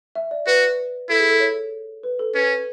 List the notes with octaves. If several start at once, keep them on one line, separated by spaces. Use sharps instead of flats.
E5
D5
F#4 B4
E4 A4
G#4
A4
C#5
B4
A4
C#4 B4